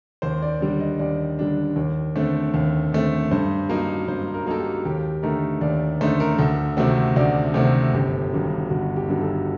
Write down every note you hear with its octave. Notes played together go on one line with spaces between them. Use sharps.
D#2 C5
D5
D3 G3 D4
D#5
D#2 D5
D3 G3 D4
D#2
D3 A3 C4
D#2
D3 A3 C4
G2 C5
F#3 A#3 D#4
G2 C5
A#4
F#3 A#3 D#4 A4
G4
D#2 G4
D3 A3 D#4 A#4
D#2 D5
D3 A3 D#4 C5
A#4
D2 A4
C3 D#3 A3 C4 F#4
D2 D5
C3 D#3 A3 C4
G1 G4
G2 D#3 F#3
G1 F#4
G4
G2 D#3 F#3
A4